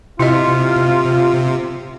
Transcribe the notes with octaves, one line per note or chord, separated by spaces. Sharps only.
C3 E4 F4 D#5